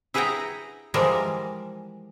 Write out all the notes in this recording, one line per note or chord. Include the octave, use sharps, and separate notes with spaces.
E4 G#4 B4 F#5 G5 A#5
E3 F3 G3 G#3 A#4 D5